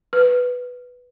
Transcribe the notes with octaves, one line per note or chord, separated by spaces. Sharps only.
B4